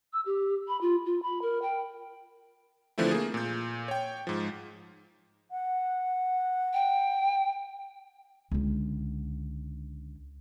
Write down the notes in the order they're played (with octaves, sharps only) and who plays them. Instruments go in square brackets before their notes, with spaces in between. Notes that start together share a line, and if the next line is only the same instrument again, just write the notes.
[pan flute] E6
G4
B5
F4
F4
B5
A#4
G5
[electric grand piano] D3 E3 F3 A3 C4 E4
A#3 G#4
A#2 G6
C#5 G5
G#2 F3
[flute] F#5
[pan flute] G5
[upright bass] C#2 D3